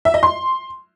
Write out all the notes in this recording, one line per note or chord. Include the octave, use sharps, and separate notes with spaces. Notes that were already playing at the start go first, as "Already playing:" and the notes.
E5
D#5
C6